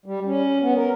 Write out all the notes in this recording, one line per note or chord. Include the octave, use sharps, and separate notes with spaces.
G3
C#4
B3
A#4